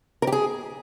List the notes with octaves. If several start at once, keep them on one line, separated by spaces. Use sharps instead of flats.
A#4
G4
G#4